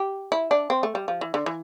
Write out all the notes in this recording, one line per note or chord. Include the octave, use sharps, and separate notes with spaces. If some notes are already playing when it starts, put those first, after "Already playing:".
Already playing: G4
E4
D4
C4
A3
G3
F3
E3
D3
E3